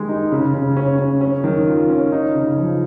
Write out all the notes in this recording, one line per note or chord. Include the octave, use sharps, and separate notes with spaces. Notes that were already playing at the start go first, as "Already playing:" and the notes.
Already playing: D#3 G#3 G4
D#4
C#3
C#3
C#4
C#4
C#4
D#3
F4
C#4
D#4
C#3
F3